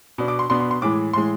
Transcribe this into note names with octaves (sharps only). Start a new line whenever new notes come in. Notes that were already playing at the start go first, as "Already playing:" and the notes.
B2 B3 D4
D6
C6
B2 B3 D4 C6
C6
C6
A2 E3 G#3 D6
A2 E3 G#3 C6